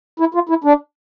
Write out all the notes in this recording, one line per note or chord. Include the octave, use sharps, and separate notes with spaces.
E4
F4
E4
D4